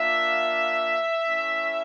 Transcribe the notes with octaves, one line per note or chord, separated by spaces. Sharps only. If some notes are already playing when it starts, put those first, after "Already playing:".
Already playing: A#3 D4 F4 E5
A3 C#4 E4